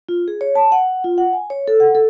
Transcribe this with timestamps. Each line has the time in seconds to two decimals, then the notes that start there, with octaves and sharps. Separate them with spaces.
0.09 F4
0.28 G#4
0.41 C#5
0.55 A5
0.72 F#5
1.04 F4
1.18 F#5
1.33 G#5
1.50 C#5
1.68 A4
1.80 F#5
1.95 A4